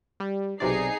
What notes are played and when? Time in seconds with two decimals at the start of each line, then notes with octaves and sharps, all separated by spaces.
0.20 G3
0.60 B1 C3 D#4 G#4 D5 C7